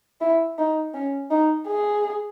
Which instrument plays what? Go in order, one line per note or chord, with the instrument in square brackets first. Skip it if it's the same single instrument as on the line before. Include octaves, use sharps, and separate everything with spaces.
[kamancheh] E4
D#4
C#4
D#4
G#4